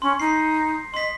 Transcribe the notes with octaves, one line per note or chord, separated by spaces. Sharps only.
C#4 C6
D#4 C7
D#5 C6 B6